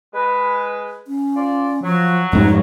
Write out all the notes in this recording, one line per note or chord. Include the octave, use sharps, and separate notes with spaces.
G#3 B4
C#4
F4 C5 D5
F3 F#3
F2 G#2 G3 D#4